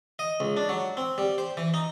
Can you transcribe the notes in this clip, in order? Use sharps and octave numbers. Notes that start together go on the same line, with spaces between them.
D#5
C#2
D4
F#3
C4
G3
C5
E3
D#4